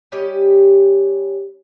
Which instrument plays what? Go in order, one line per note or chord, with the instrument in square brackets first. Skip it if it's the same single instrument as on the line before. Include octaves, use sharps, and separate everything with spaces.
[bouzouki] G3 C#4 G4 D#5